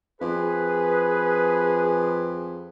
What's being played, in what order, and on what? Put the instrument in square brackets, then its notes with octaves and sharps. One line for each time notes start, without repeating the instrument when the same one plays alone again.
[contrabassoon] F2 [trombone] G#4 [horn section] B4